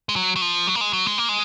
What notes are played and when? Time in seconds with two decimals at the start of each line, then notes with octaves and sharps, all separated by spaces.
0.09 G#3
0.16 F#3
0.36 F#3
0.42 F3
0.67 F#3
0.75 A#3
0.81 G#3
0.93 F#3
1.06 G#3
1.18 A#3
1.29 G#3